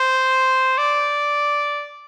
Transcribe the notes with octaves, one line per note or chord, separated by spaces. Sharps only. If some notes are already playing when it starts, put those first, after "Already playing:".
Already playing: C5
D5